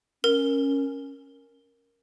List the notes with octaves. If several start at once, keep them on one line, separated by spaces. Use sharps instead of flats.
C#4 A#4